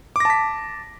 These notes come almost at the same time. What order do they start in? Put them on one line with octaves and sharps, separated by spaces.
D6 A#6 A5 B6